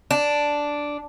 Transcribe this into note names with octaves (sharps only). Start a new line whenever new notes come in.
D4